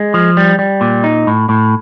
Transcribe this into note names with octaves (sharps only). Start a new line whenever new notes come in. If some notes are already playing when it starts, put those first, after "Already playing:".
Already playing: G#3
F3
G3
G3
A#2
D#4
A2
A2